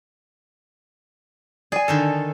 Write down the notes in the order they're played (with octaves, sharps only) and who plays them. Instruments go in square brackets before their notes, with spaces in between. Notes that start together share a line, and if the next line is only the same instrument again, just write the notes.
[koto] G#4 [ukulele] D5 G#5
[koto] D3 D#3 A4